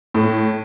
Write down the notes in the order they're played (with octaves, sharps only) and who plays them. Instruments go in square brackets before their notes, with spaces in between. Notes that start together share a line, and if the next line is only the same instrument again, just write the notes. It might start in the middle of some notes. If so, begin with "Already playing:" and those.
[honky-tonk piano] A2